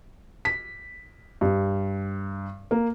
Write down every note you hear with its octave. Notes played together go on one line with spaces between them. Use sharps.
B6
G2
A#3